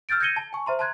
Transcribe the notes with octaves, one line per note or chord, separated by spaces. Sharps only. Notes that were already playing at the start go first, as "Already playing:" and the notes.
E6 F6 G6 A6 D7
G6 G#6 A#6 C#7 D#7 G7
A5
G#5 C#6
C5 E5 A#5 C6
A5 A#5 C6 F#6 G#6